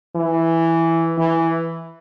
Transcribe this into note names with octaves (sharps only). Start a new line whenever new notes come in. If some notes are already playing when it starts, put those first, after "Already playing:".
E3
E3